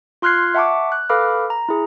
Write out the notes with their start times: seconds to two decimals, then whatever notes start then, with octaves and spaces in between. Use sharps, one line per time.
0.22 F4 C6 F6 F#6 G#6 C7
0.54 E5 F#5 A5 C#6 D6
0.92 F#6
1.09 A4 B4 F5 B5 D6 F6
1.50 A#5
1.69 E4 G#4